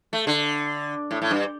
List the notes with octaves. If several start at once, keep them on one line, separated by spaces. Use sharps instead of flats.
A3
D3
A2
A2
G2